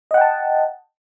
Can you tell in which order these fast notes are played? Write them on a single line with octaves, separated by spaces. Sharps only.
D#5 F#5 G5 A5